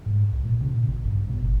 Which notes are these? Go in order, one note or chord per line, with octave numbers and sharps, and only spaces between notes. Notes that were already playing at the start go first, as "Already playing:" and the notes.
G#2
C2
A#2
C#3
A#2
A1
G2
B2
G1